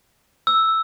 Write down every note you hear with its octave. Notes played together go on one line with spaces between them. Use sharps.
E6